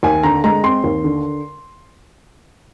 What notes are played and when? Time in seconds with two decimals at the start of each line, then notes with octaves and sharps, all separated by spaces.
0.03 D#2 G#5
0.23 D3 A#5
0.44 G#3 A#5
0.63 C4 C6
0.84 D#2
1.04 D3